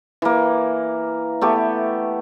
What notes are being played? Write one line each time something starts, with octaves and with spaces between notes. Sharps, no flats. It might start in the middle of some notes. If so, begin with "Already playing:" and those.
E3 A#3
A3 B3 G4